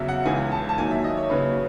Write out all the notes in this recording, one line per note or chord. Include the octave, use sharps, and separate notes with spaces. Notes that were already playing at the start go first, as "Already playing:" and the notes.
Already playing: E2 C#3 F#3 E5
F#5
C#2 C#3 E3 G#5
A5
A5
D#2 D#3 F#3 G#5
E5
D#5
C#5
D#2 C#3 F#3 B4